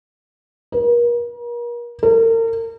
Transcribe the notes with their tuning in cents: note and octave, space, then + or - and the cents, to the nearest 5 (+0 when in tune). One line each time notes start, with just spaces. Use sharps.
A#4 +40
A#4 -35